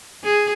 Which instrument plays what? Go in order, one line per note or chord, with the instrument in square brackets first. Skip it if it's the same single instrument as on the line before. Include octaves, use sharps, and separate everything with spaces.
[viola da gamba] G#4